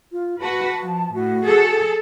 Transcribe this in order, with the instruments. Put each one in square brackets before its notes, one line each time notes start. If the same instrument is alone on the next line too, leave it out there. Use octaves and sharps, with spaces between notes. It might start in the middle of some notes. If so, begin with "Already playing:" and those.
[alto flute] F4
[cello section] F#4 B4 [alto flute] A5
[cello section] F3
[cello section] A2 [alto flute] F#4
[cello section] G#4 A4